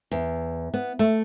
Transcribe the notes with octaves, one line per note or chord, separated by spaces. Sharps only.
E2
B3
A3